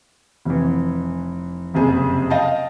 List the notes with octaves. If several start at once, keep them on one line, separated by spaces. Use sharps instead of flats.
F1 E3
F#1 F2 C3 G#4
D#5 F5 G5 A5